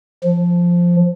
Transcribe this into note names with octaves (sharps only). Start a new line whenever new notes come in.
F3